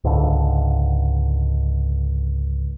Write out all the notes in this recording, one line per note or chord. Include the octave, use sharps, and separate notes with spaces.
C#2 G#2 D3